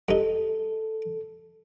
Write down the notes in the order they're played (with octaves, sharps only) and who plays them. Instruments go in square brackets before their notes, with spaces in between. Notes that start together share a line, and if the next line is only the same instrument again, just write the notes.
[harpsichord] G2 D#4 [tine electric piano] A4